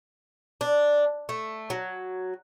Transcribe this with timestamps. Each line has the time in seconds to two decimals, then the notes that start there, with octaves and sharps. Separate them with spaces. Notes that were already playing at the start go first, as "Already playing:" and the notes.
0.61 D4
1.29 A3
1.70 F#3